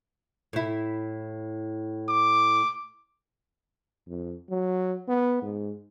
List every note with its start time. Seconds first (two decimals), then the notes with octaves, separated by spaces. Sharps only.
0.53 A2 E4
2.09 D6
4.08 F2
4.50 F#3
5.08 B3
5.42 G#2